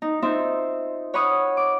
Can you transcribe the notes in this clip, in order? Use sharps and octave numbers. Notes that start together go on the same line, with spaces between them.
D#4
C4 D#4 F4 C5 E5
C#5 F#5 B5 C#6 D#6 F6
D6